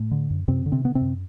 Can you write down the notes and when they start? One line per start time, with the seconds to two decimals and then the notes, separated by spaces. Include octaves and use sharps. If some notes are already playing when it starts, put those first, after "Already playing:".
Already playing: A2 A3
0.11 D3
0.30 F#2
0.48 F#2 C3 C4
0.66 D3
0.72 C3 C4
0.84 D3 B3
0.95 C3 C4
1.01 F#2